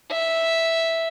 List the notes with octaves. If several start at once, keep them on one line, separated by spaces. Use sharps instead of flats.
E5